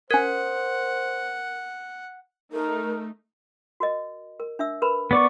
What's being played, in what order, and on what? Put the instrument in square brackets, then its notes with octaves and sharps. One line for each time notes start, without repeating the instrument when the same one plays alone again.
[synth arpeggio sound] C#4 G#6 [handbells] A#4 [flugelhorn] C5 [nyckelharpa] F#5
[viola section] A3 D#4 [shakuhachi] A#4
[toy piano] F#4 A#4 D#5
A#4
D4 E5 E6
A#4 B4 B5
[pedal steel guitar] B3 D5 C#6